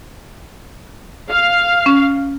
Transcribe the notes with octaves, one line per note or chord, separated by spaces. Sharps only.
F5
C#4